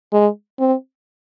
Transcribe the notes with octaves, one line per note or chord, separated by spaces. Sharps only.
G#3
C4